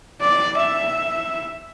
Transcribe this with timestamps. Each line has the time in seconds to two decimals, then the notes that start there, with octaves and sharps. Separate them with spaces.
0.21 D5
0.57 E5